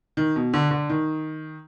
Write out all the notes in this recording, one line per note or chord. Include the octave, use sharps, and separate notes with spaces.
D#3
B2
D3
D3
D#3